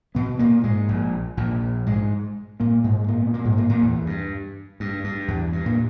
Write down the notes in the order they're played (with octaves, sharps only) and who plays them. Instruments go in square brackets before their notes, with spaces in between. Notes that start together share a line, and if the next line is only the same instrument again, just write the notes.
[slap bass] B2 B3
A#2 A#3
G#2 G#3
A#1 A#2
A#1 A#2
G#2 G#3
A#2 A#3
G#2 G#3
A#2 A#3
B3
A#2 A#3
G#2 G#3
A#2 A#3
A#2 A#3
E2 E3
E2
G2
G2
G2
E2
G2
A#2